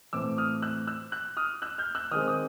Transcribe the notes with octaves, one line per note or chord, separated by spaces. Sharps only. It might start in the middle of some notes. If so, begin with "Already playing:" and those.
A2 E3 A3 C4 D6 E6
D#6 F6
E6 F#6
E6 F#6
E6 F#6
D#6 F6
E6 F#6
F6 G6
E6 F#6
D#3 G#3 C4 D#6 F6
D#6